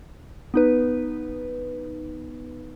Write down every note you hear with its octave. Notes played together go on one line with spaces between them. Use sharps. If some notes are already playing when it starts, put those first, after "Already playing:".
B3 D#4 B4